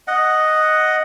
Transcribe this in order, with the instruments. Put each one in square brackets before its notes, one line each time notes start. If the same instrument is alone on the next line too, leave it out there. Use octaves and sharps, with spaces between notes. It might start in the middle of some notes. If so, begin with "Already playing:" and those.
[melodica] D#5 F#5